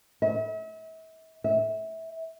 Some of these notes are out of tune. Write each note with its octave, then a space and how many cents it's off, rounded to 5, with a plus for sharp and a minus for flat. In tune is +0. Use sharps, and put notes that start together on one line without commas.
E5 -40
E5 -20